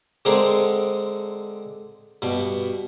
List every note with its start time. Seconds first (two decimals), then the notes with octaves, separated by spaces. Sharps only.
0.25 D3 G#3 C4 G#4 A#4
2.22 G2 B2